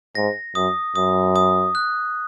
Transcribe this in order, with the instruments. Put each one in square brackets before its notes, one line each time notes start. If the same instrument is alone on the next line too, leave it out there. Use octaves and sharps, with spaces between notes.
[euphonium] G#2 [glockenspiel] A#6
[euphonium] F#2 [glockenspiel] D#6
[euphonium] F#2 [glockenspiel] D#6
[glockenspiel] D#6
F#6